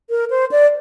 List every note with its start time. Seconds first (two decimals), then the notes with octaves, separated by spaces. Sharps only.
0.10 A#4
0.30 C5
0.52 D5